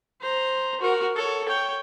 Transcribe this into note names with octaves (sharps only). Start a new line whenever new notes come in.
C5 A#5
F#4 A#4
A4 C#5
C#5 G5